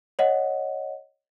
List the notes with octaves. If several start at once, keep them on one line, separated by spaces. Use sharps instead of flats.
C#5 D#5 F#5